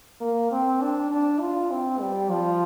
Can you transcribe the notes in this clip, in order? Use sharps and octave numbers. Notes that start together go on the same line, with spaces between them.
A#3
C4
D4
D4
F4
C4
G3
F3